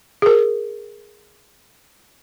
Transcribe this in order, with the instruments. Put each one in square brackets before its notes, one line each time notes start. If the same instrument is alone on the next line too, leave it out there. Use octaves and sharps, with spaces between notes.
[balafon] G#4 A#4